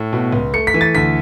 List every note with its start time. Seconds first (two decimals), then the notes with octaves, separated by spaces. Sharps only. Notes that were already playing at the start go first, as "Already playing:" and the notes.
Already playing: A2
0.13 B2
0.32 C#2
0.53 A3 C#7
0.67 B6
0.74 E3
0.81 A6
0.95 D2 B6